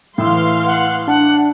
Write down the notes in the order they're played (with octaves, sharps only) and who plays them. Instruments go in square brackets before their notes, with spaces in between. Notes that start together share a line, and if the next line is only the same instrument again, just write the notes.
[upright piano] A2 E6 [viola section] E3 F5 C6
[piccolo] F#5
[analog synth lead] D4 [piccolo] F#5